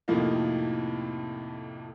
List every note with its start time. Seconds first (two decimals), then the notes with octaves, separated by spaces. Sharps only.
0.08 F2 A2 C3 F3 A#3 D#4